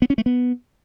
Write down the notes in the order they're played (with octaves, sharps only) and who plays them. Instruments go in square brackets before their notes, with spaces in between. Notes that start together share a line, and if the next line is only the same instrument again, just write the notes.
[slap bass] B3
C#4
A3
B3